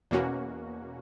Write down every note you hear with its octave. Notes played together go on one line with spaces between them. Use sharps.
E2 B2 A#3 C#4 F#4